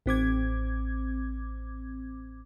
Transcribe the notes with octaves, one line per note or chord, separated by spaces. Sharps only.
A1 C4 D6 G#6